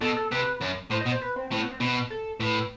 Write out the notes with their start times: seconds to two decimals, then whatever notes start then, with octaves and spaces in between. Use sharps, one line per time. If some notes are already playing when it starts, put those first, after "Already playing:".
0.01 B2 A4
0.17 A4
0.31 C3 B4
0.61 F#2
0.91 A2 C5
1.01 D#5
1.06 B2
1.12 C5
1.22 B4
1.36 C4
1.51 A2 C4
1.61 B3
1.71 C4
1.80 B2
2.10 A4
2.40 A2 B4